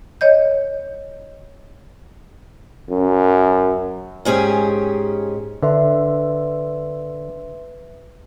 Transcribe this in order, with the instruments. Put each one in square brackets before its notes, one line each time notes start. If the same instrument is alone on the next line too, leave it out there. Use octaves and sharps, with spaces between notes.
[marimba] C#5 D#5 G6
[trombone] F#2
[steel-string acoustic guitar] G#2 C#4 G4 G#4
[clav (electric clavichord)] D3 [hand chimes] B4 E5 C6